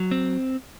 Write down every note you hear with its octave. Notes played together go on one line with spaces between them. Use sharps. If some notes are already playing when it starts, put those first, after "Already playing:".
Already playing: F#3
C4